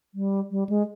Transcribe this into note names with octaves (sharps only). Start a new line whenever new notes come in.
G3
G3
G#3